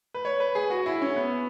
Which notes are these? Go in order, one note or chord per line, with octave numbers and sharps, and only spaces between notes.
B4
C#5
B4
G#4
F#4
E4
C#4
B3